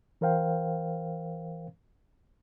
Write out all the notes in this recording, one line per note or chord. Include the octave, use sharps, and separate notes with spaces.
E3 A#4 C5 F5 G5